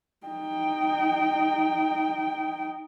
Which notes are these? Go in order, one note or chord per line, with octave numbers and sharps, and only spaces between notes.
D#4 G5